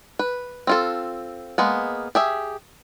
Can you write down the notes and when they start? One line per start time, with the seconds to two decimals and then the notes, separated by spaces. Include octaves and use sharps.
0.19 B4
0.67 C4 F4 A4
1.58 G#3 A#3 B3
2.15 G4 G#4 E5